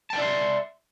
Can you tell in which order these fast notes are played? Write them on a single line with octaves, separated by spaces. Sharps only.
A5 G5 D5 E5 C6